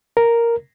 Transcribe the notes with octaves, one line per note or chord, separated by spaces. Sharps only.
A#4